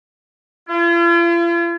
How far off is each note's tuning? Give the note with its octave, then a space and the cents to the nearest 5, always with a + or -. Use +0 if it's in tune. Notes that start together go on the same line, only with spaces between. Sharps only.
F4 -45